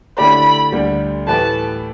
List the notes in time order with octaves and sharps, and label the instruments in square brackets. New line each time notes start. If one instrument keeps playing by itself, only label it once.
[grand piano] D3 A3 E4 G4 D5 [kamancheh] B5
[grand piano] D2 D3 G3
[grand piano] A2 E3 A3 G4 B4 [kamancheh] A5